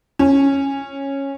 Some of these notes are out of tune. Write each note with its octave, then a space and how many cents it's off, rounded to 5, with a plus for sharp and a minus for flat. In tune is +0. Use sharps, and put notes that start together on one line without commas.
C#4 -10